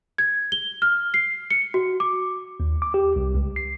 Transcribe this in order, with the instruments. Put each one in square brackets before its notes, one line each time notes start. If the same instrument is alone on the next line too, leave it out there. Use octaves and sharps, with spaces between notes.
[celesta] G#6
G7
F6
C7
C#7
F#4
D6
[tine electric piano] D#2
D6
G4
C2
C#2
C7